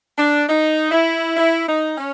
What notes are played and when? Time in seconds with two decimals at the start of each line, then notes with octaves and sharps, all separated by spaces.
0.17 D4
0.47 D#4
0.91 E4
1.36 E4
1.67 D#4
1.97 C#4